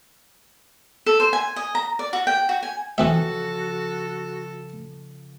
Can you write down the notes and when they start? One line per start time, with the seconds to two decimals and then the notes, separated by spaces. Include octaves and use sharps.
1.06 A4
1.20 C5
1.33 G#5
1.56 D#5
1.75 A#5
1.99 D5
2.13 F#4
2.27 G5
2.49 F#4
2.63 G#5
2.98 C#3 E3 F3 C4 F#4 A4 E5